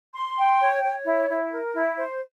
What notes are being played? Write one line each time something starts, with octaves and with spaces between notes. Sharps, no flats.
C6
G5
C#5
C#5
E4
E4
A#4
E4
C5